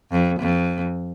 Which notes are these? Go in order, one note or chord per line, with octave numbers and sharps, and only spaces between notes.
F2
F2